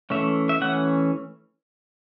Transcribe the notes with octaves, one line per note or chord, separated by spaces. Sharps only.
E3 A3 C#4 E5
E5
E3 A3 C#4 F#5